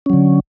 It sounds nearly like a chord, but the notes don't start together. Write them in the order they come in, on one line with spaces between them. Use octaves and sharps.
C#4 F#3 D3